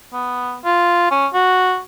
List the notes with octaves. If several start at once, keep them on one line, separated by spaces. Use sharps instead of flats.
B3
F4
C#4
F#4